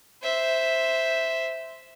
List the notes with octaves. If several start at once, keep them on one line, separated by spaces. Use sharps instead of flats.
C5 E5